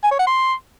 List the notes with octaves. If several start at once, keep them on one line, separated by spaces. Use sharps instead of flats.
G#5
C#5
F#5
C6